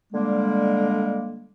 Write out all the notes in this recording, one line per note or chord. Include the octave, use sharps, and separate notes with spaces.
D3 G3 G#3 A#3